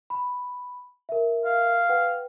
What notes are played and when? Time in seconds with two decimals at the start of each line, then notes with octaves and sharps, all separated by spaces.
0.10 B5
1.09 A#4 E5
1.45 F5
1.89 B4 F#5 G5